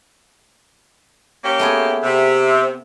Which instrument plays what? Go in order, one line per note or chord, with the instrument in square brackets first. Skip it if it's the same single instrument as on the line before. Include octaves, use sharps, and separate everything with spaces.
[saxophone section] A#3 C#4 G4
[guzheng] A3 B3 G#4
[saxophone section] C3